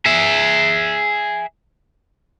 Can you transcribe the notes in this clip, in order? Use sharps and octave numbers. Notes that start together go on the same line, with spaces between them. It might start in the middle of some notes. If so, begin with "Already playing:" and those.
G#4 E5